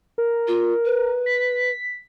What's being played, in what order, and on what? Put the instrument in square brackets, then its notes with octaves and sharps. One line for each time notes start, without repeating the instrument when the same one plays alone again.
[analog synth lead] A#4
[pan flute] F4
B4
[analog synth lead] B6